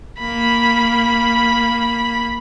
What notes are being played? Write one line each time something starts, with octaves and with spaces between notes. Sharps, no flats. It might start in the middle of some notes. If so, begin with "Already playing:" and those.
A#3 B5